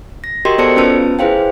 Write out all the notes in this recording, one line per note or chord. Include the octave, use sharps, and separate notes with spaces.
A#6
F#4 G4 A#4 D#5 G5 C6
B3 A4 C5 D5 A5 C#7
B3 C#4 F4 B4 A5 E6
E4 G#4 B4 C5 F5 G5